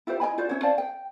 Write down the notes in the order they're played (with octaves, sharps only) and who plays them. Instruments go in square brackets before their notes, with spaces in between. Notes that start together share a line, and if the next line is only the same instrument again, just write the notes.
[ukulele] E4 F4 G4 C5
E4 D#5 G#5 B5
F4 F#4 C5 D5
C#4 E4 C5 C#5
C5 D5 F5 A5
G5